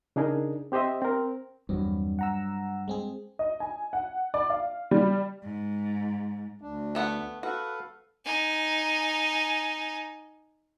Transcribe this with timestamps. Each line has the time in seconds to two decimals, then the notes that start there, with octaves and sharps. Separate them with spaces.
0.16 C#3 D4 D#4 G#4 A#4
0.72 C4 G4 C5 D#5 E5
1.02 C4 A#4
1.69 E2 G2 F#3 C4
2.19 F#5 A#5 E6
2.88 G#3 C4 G#4
3.39 D#5
3.60 G#5
3.93 F#5
4.34 D5
4.50 F5
4.91 G3
5.43 G#2
6.61 D2 D4
6.95 A3 B3 F#5
7.43 F#4 A4 B4 F5
8.25 D#4 G#5